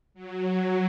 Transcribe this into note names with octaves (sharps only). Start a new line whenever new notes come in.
F#3